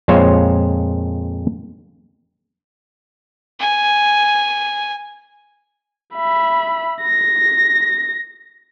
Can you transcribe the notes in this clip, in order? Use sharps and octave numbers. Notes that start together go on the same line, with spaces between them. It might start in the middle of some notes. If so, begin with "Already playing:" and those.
F2 A#2 G#3 F4 C5 C#5
G#5
E5 B5
A#6